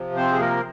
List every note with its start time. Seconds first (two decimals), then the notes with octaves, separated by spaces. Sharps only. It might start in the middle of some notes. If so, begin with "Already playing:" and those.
Already playing: C3 F3
0.16 C4 C5
0.32 G#4
0.40 A#3 A#4